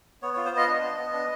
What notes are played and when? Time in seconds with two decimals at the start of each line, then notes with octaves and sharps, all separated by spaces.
0.22 B3 C#5
0.34 F4 C#5
0.45 C5
0.52 B3 D#5
0.67 D4
0.83 B3
0.98 B3
1.13 D4